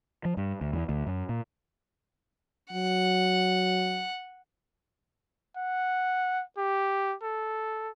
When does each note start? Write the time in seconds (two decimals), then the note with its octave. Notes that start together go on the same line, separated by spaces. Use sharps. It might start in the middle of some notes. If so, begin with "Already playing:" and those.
0.25 F3
0.37 G2
0.61 D2
0.73 E2
0.89 D2
1.07 F#2
1.29 A#2
2.73 F#3 F#5
5.57 F#5
6.58 G4
7.22 A4